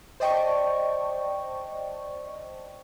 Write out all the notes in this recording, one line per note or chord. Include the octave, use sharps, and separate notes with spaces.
C5 D5 D#5 G5 A5 C#6